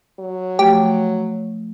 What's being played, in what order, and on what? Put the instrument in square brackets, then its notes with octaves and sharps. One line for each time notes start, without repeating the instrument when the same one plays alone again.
[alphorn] F#3
[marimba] F3 A3 [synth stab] G4